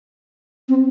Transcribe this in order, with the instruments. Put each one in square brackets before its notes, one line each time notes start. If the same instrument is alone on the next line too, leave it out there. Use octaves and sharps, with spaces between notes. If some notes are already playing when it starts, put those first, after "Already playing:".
[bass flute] C4